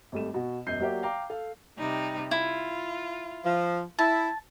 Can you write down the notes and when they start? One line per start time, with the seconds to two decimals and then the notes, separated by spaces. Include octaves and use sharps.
0.12 G#1 G3 A3 E7
0.34 B2 F#4
0.66 E1 F#2 D#5 G6 C7
0.80 F#3 A#3 F#4 G4 D5 E5
1.03 F5 G5 A#5 D6
1.30 A4 F5
1.78 C3 G3 D#4
2.31 E4 F4
3.45 F3
3.99 E4 A5